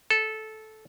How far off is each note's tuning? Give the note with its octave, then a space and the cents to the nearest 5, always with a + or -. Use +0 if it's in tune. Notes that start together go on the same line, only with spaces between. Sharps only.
A4 -15